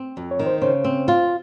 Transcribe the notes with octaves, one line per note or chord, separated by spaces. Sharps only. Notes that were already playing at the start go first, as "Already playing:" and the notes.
Already playing: C4
F2
C#5
D#3
C5
C#3 C5
C4
F4